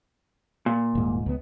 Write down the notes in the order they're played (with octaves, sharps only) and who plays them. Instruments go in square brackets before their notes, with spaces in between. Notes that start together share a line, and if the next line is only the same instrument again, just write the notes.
[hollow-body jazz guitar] A#2
[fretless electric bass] D#1 G#2
C#2 B3